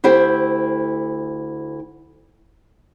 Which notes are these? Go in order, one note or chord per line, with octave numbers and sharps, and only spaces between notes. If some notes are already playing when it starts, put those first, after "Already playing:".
D2 E4 G4 C5 G5